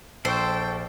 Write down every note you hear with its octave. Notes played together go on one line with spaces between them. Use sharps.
A#1 A4 C5 G5 C#6